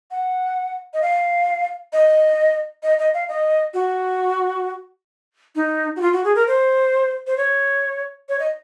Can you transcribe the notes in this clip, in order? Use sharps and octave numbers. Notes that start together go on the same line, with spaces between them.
F#5
D#5
F5
D#5
D#5
D#5
F5
D#5
F#4
D#4
F#4
F4
F#4
G#4
A#4
C5
C5
C#5
C#5
D#5